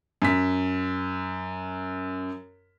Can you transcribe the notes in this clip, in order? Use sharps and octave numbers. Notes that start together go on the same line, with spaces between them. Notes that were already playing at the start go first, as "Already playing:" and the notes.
F#2 B6